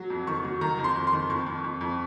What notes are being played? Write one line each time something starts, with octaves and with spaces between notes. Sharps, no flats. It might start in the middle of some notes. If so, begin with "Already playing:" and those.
Already playing: F#3
F2
D#3 C#6
F#3
D#3 A#5
F2
C6
F2
C6
D#3
F2 C#6
F2
F2
F2